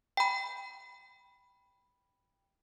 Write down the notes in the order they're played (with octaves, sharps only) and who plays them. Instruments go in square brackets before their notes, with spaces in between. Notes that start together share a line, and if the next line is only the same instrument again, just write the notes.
[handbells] G5 B5